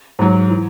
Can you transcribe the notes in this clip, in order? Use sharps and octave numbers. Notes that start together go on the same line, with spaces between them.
G#2 F#3
E3